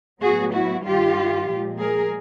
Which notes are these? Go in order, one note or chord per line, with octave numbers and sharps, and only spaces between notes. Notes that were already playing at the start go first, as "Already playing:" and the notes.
A2 F#3 B3 F#4 G#4
E4 F#4
G2 D#3 G3 F4 G4
A#2 F3 G#3
G#4 A#4